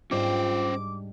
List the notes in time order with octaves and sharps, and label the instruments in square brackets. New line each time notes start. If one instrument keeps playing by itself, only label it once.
[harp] G#2 G3 D4 [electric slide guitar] C#4 C5 [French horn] F4 [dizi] D6